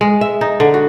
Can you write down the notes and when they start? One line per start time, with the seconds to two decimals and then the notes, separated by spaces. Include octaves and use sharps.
0.01 G#3
0.21 E5
0.41 D#4
0.60 D3
0.74 F#4